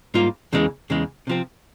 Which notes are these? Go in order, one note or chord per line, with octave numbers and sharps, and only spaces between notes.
G#2 G3 A#3 F4
E2 C#3 E3 G#3
E2 C#3 E3 G#3
C3 F3 C4